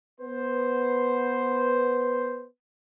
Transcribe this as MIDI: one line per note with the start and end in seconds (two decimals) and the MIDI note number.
0.21 2.46 59
0.21 2.46 71
0.21 2.46 72